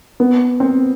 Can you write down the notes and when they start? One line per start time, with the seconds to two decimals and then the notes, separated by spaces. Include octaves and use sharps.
0.20 B3
0.60 C4